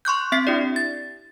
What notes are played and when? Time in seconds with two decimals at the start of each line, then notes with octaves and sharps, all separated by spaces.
0.05 C6 C#6 F#6 G6
0.32 C4 E5 B6 C7
0.47 D4 E4 G4 D5
0.76 A6